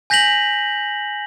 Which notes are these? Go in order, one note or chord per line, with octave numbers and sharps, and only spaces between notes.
G#5 G6 A#6 B6 F7 F#7